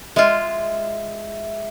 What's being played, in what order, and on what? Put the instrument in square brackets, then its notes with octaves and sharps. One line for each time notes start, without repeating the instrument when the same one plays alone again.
[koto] G#3 F4 [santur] E5